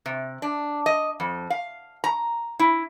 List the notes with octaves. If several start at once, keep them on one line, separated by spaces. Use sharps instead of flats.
C3
D4
D#5
F2
F5
A#5
E4